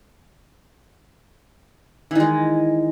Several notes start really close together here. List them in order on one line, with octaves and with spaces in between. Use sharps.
E3 D#3 G#3